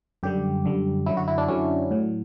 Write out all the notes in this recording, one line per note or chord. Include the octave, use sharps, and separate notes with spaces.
F#2 D3 G3 G4
F#2 D3 G3
F#2 D3 F#3 E4
F#4
E4
D4
F#2 D3 F#3 C#4
A2 F#3